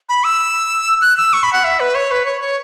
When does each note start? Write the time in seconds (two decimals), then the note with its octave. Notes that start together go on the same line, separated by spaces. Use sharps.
0.09 B5
0.24 E6
1.01 F#6
1.17 E6
1.33 C#6
1.43 B5
1.53 F#5
1.64 E5
1.80 B4
1.95 C#5
2.11 B4
2.26 C#5
2.41 C#5